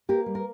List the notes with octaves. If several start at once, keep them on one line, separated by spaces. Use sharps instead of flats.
A#3 G4 A#4
G3
A#4